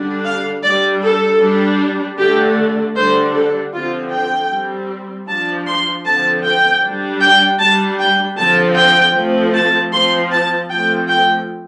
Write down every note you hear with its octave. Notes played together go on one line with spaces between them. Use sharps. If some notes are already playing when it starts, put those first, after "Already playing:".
Already playing: D3 G3 D4
F5
G3 D4 D5
A4
G3 D4
D3 A3 D4 G4
D3 G3 D4 C5
A4
D3 F3 C4 F4
G5
G3 C4
F3 D4 A5
C6
D3 F3 C4 A5
G5
G3 D4
G5
G3 D4 A5
G5
D3 F3 C4 A5
G5
F3 A3 C4
A5
F3 C4 C6
A5
F3 A3 C4 G5
G5